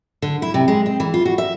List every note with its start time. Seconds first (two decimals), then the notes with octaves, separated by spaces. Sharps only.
0.22 D3
0.42 E4
0.54 C3
0.68 G#3
0.86 C4
1.00 E3
1.14 F4
1.25 F#4
1.38 E5